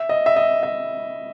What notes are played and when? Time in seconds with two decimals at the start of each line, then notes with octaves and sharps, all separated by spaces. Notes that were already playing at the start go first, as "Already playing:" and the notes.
Already playing: E5
0.09 D#5
0.26 E5
0.36 D#5
0.63 E5